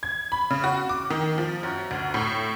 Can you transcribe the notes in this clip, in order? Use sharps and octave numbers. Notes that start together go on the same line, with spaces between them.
G#6
B5
C#3
F#4
D6
D#3
F3
F#2
D2
A2